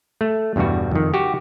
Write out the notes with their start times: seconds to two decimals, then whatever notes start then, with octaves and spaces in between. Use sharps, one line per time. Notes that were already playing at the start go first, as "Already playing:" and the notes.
0.21 A3
0.56 E2 G2 B2 G3 F#4
0.91 F2 D#3
1.14 F#4 G4